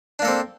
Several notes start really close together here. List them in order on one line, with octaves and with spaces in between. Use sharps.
D4 A#3 A4 C4